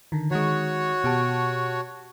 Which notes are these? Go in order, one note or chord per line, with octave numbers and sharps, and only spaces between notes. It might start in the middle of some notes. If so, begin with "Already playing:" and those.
D3 D#3
D#3 G#3 F#4 C#5
B2 G4 A5